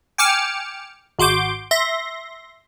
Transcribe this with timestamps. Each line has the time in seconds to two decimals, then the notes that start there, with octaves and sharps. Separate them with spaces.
0.18 G5 G#5 D6 F6 C#7 E7
1.19 G#1 F#4 C6 D6 G6
1.71 E5 C6 A#6